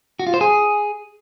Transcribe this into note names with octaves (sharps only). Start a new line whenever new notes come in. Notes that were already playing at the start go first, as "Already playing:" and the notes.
F#4
F4
C5
G#4